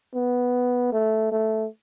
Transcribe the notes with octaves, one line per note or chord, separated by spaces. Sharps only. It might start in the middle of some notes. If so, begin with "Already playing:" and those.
B3
A3
A3